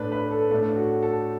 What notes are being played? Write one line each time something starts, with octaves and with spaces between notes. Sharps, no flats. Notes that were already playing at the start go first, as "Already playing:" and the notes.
Already playing: A2 A3 D4 B4
B4
A4
A2 A3 D4 A4
F#4
A4